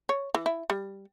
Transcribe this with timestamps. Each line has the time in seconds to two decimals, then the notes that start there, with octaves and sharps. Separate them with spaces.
0.09 C#5
0.35 E3
0.46 E4
0.70 G3